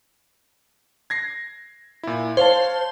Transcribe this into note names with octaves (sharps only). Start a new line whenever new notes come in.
G#6 A#6 C7
A#2 E4
C5 C#5 F5 A5